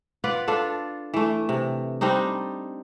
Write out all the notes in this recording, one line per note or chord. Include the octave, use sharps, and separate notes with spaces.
F4 B4 D5 F#5
D4 F4 A4
E3 A3
C3
G3 C4 D4 D#4